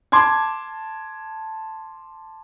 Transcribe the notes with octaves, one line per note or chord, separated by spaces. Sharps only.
A5 C6 D6 G#6